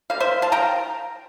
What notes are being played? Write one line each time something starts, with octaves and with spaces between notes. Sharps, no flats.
G3 A#3 F5
C5 E5
F5 A5
G5 A#5